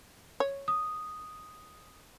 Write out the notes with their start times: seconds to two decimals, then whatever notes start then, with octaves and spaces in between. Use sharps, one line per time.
0.40 C#5
0.68 D#6